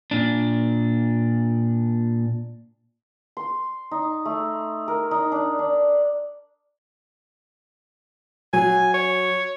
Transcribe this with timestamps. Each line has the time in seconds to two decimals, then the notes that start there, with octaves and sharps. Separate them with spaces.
0.11 A#2 D4
3.37 C6
3.91 D#4
4.25 A3
4.88 A#4
5.11 D#4
5.32 D4
5.59 D4
8.53 F#3 G#5
8.94 C#5